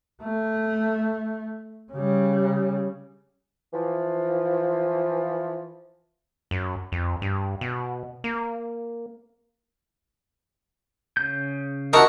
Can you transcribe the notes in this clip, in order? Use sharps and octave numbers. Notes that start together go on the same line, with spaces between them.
A3
C#3 G3
E3 F3
F#2
F2
G2
B2
A#3
C#3 G6
D#4 E4 F#4 A#4 A5 A#5 C#6